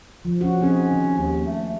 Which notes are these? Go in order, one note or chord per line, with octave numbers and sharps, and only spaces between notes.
F3
C#4 F#4
C4 C#4 D#4 G#4
D#3
D#2
A3